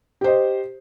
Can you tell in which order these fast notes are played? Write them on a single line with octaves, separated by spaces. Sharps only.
G4 C5 D#5